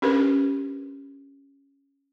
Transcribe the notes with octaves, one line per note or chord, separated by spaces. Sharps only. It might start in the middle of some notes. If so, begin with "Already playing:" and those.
C#4 D4 G4 A#4 B4